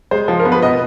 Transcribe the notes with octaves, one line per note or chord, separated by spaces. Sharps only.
G#3 C5
F3
A#4
B3
B4
B2 D#5